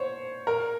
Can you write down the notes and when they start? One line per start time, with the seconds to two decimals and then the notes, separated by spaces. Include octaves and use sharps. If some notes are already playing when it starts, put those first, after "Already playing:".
Already playing: C5 C#5
0.47 A#4